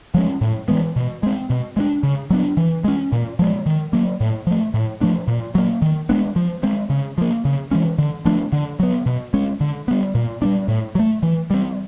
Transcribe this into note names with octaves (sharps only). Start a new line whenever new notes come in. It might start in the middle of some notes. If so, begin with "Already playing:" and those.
F3 G#3 C#4
A2
E3 G#3 B3
B2
G#3 C4
B2
G#3 B3 D4
C#3
F#3 B3 D4
E3
G#3 C#4
A#2
F3 G#3
D#3
F#3 A#3
A2
F3 A3
A2
F3 A3 D4
A#2
F#3 A#3
D#3
G#3 B3 D4
F3
G#3 C4
C#3
F3 A#3
C#3
E3 G#3 C#4
D3
F3 A3 D4
D3
F#3 B3
B2
G#3 C#4
D3
G3 B3
A#2
G3 B3 D4
A2
F#3
A3
E3
G3 C4